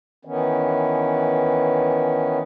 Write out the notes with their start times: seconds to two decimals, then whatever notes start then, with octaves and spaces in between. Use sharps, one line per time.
0.25 D#3 E3 B3 C#4